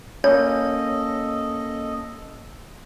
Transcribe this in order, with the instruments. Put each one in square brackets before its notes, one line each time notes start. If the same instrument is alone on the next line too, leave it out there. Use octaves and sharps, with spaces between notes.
[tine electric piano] A#3 C#4 [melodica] A4 D#5 [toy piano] C#5